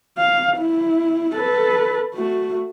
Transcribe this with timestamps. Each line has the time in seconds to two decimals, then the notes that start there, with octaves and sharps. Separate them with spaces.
0.18 F5
0.58 E4
1.35 A4 B4
2.14 A3 F#4